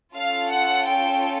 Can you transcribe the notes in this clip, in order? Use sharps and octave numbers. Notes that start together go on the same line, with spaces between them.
C#4 F4 A4 F5
F#5
G5